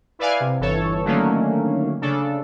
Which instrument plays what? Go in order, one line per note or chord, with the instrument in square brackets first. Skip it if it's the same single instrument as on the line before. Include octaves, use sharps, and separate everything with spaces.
[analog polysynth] E4 B4 D5 F5 G#5
C3
G1 E3 A4 C#5
D3 D#3 F#3 A3 A#3 C#4
C#3 D4 A4